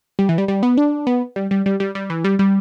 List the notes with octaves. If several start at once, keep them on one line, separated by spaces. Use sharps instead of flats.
G3
E3
G3
G3
B3
D4
B3
G3
G3
G3
G3
G3
E3
G3
G3